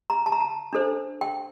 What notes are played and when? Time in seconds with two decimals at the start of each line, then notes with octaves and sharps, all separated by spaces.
0.10 A#5
0.26 A5
0.32 A#5
0.40 A5
0.73 D4 A4 C5
1.21 G5